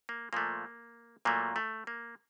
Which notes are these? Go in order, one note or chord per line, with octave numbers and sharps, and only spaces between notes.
A#3
A#2 F3 A3 A#3
A#2 F#3 A3 A#3
A3
A#3